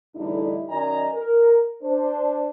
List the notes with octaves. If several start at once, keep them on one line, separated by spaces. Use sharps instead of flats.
E2 A2 D3 G3 D#4 E4
F#2 D#3 D5 D#5 G#5 A#5
A#4
D4 C5